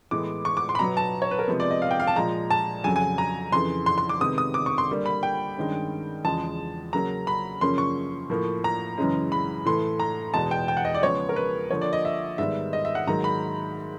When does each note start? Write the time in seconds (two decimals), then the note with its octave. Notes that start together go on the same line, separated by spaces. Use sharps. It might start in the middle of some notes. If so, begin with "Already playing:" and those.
0.11 A2 E3 G#3 B3 D6
0.45 C#6
0.57 D6
0.69 C6
0.75 B5
0.79 B2 F#3 B3 A#5
0.97 A5
1.22 C#5
1.31 B4
1.39 A#4
1.48 C3 F3 G#3 B3
1.60 D5
1.71 D#5
1.82 F5
1.91 G5
2.00 F5
2.07 A5
2.16 A#2 F3 G#3 A#5
2.51 A5
2.84 F2 C#3 F#3 G#5
2.96 G#5
3.18 A#5
3.52 F2 C#3 E3 C6
3.86 C6
3.98 C6
4.09 D6
4.21 C3 D#3 G#3 B3 D#6
4.38 D#6
4.54 D6
4.66 C#6
4.78 C6
4.89 D3 G3 A#3
5.06 B5
5.23 G5
5.57 G2 D#3 G#3 C#4
6.25 E2 C#3 F3 G#3 A5
6.93 C#3 F#3 A#3 C#4 A#5
7.27 B5
7.61 F#2 C#3 F3 A#3 C#4 C6
7.78 C#6
8.30 A2 F3 A#3
8.64 A#5
8.98 F#2 C#3 E3 G#3 C#4
9.32 B5
9.65 A2 E3 A3 C6
10.00 A#5
10.34 E2 B2 G#3 A5
10.51 G5
10.68 G5
10.77 F#5
10.85 D#5
10.94 D5
11.02 C#3 F3 G#3 B3 C#5
11.29 A#4
11.36 B4
11.70 D3 F3 A#3 C#5
11.82 D5
11.93 D#5
12.05 E5
12.38 G#2 D#3 G3 B3 E5
12.73 D#5
12.85 E5
12.95 F#5
13.07 G#2 D#3 F#3 A#3 A#5
13.24 B5